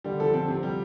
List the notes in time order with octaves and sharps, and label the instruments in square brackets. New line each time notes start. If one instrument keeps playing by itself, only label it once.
[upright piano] D3 [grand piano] G3
[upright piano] F3 [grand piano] A4
[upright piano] D3 [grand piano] C4
[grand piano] C3
G3